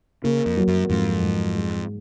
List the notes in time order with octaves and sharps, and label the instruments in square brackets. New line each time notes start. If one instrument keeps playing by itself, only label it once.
[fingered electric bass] C#3 [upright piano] A#3
[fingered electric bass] F2
[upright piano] F#3
[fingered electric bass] F#2
[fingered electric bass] F2 [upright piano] G#2
[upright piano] G#2
G#3